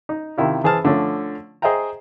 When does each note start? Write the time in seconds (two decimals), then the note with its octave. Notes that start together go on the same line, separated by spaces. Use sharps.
0.09 D#4
0.38 C3 D#3 E4 F4
0.64 E3 G#4 C5 A5 F6
0.85 D3 F3 A3 C#4
1.62 G#4 C5 D#5 E5 G5 A#5